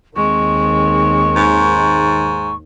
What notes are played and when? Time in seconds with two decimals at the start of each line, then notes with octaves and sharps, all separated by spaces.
0.16 D#2 D#3 G#3 C4 C#6
1.36 G#2